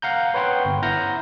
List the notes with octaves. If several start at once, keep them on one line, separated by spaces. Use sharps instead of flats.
F5 F#5 A#5 G6
B4 C#5 F#5 G5 C6
G1
E4 F#5 A#5 F6 G6 A#6